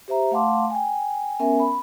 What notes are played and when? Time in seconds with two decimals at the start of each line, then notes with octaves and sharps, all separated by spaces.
0.08 G4 C5 E5 A#5
0.31 A3 F5 F#5 A5 C6 D6
0.70 G5 G#5
1.39 B3 C#4 A#4 E5 G#5
1.60 B5